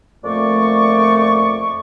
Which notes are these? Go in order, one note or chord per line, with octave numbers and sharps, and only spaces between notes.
F2 A#2 A3 D5 C#6